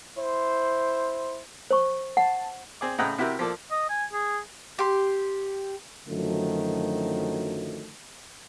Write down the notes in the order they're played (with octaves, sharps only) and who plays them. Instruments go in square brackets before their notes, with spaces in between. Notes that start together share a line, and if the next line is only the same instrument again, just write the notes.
[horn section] E4 C5
[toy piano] C5 C#6
[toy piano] F#5 [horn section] A5
[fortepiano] C4 G#4 D5
A2 C#3 D#5 F#5 G5 A#5
C3 E4 F#4 G4 A#4
F3 A#3 A4 D5
[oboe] D#5
G#5
G#4
[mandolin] G4 C6
[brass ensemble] F#2 D3 D#3 F3 F#3 A3